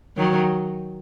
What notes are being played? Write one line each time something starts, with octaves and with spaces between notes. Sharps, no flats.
D#3 F#3